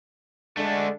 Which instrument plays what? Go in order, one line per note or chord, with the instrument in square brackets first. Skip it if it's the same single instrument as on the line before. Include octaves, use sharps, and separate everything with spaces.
[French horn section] D3 G#3 [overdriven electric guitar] A3 D4